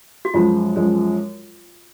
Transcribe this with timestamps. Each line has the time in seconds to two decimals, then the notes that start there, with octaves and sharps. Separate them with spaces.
0.25 F#4
0.34 F#2 F3 G#3 F4
0.76 F#2 F3 G#3